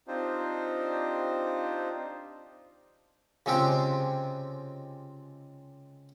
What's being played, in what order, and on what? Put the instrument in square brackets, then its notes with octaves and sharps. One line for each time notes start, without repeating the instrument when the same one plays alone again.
[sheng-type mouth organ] C4 D4 D#4 F4 G4 C5
[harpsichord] C#2 C3 G#3 C4 G4